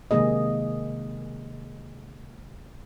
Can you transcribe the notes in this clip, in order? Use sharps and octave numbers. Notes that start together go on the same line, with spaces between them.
C3 D#3 G#3 A#3 G#4 D#5